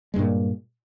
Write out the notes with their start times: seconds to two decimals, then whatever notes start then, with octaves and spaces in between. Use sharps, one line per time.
0.14 G#3
0.16 G2
0.19 A#2